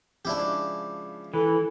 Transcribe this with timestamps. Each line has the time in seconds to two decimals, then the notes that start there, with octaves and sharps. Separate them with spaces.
0.25 C#3 F3 G#3 D4 E4 G4
1.34 E3 A4